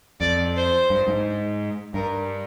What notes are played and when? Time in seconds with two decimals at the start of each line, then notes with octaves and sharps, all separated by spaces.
0.20 F2 D5
0.56 C5
0.90 G2
1.08 G#2
1.94 G2 A#4